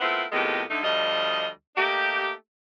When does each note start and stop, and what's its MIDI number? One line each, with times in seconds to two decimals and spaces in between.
0.01 0.25 57
0.01 0.25 59
0.01 0.25 60
0.01 0.25 64
0.01 0.25 65
0.01 0.25 70
0.32 0.62 41
0.32 0.62 45
0.32 0.62 51
0.32 0.62 56
0.32 0.62 59
0.32 0.62 67
0.70 0.83 50
0.70 0.83 57
0.70 0.83 63
0.83 1.47 38
0.83 1.47 53
0.83 1.47 55
0.83 1.47 75
1.76 2.31 57
1.76 2.31 58
1.76 2.31 63
1.76 2.31 67